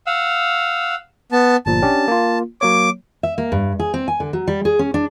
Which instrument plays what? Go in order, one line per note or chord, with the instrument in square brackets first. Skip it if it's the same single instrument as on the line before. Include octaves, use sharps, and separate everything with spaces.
[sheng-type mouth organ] F5 F#5 E6
B3 A5
[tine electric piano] G1 A#2 F3 [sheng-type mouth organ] A5
[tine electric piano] C#4 D4 G4
A#3 F4
[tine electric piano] F#3 A#3 C#5 [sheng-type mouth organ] D6
[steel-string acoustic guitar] E5
A#3
G2
G#4
C4
G#5
D3
F#3
G3
G#4
C#4
D4